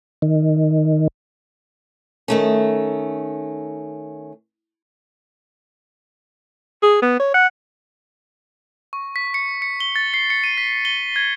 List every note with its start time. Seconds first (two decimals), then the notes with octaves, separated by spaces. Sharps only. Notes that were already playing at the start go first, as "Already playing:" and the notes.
0.22 D#3
2.28 D#3 A3 C#4
6.83 G#4
7.02 B3
7.19 C#5
7.34 F#5
8.93 C#6
9.16 B6
9.34 C#7
9.62 C#7
9.80 G7
9.96 A6
10.14 C7
10.30 C#7
10.44 D#7
10.58 B6
10.85 G7
11.16 G#6